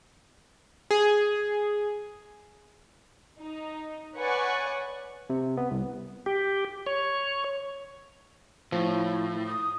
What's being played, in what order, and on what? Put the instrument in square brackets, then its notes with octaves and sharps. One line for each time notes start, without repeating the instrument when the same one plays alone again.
[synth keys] G#4
[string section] D#4
B4 C#5 D5 F#5 G#5 C#6
[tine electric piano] C3
B3
C2
[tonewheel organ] G4
C#5
[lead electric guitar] A2 [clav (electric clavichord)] F3 [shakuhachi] E4
[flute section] D#6